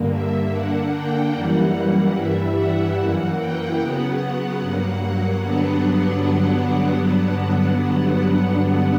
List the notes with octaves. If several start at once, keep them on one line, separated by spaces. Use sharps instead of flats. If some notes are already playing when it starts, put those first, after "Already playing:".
Already playing: G2 D3 A#3
E5
D3 A#3 D4 F#5
G5
F#2 E3 G3 A#3 F#5
G2 E3 G3 E5
F#5
F#2 E3 A#3 F#5
G5
C#3 F#3 B3 F#5
G2 F#3 A#3 F#5
G2 D3 F#3 B3 D4